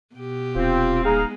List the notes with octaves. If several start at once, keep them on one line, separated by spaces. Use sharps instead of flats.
B2 G4
D#1 C4 F4
G#3 B3 D#4 G#4 F5 A#5